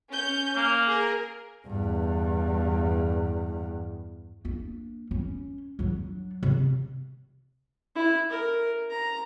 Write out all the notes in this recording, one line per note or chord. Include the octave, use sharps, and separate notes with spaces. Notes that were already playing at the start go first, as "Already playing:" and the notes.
C#4 G6
A#3
G#4 A#4
E2 G2
A#3 D4
C#4
F#3 D4
C3
E4
A#4
A#5